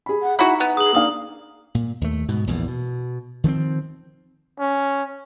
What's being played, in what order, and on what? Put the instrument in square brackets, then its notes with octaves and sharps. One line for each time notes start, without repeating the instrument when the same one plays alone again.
[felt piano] G#4 B5
[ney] F#5
[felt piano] D#4 [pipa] E4 F#4 [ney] E5 [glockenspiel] A#5
[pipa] B3
[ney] G#4 [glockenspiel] D#6 F#7
[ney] A#3 [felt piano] D4 D#4 F5 [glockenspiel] D#6
[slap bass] A#2
D#2 A3
G#2 B2
A#1 E2 A2
B2
D#3 F3 B3 C4
[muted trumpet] C#4